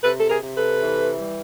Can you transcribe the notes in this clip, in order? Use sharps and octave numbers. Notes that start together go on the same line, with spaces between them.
C3 A4 B4
A4
G#4 A#4
C3
A4 B4
E3
G3